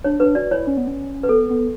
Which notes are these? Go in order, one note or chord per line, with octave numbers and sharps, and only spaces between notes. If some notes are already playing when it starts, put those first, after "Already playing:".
D4 C#5
D4 B4
F#4 D5
E4 C#5
C#4
B3
C#4
B4
B3 A4
B3